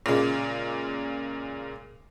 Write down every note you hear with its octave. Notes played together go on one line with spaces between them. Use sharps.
A#2 C#3 G#3 A#3